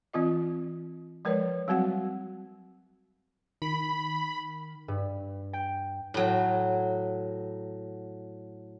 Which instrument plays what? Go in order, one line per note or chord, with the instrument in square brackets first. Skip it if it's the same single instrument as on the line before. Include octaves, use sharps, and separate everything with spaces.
[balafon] E3 C4 F4 D#5
F3 G#3 A#4 B4 C#5
F#3 G3 C4 F#4 F#5
[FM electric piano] D#3 [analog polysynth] B5
[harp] G2
G5
[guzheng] A2 F#3